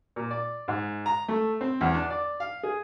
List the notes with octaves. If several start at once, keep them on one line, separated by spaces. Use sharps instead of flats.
A#2
D5
G#2
A#5
A3
C4
E2
D4
D5
F5
G#4